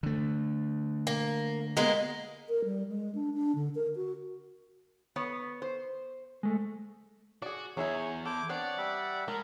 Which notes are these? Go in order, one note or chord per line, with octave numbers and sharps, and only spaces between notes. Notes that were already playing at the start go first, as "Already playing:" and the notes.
D3 A3
A#3
G#3 A#3 B3
A#4
G3
G#3
D4
D4
D3
A#4
F#4
B3 C#5
C5
G#3 A3
F#4 G#4 D5
E2 F#3 E4 G#4 C#5 E5
E4 A4 C5 D6
B3 C4 D4 C#5 D5 F#5
G3 E5
G#3 A#4 A5 A#5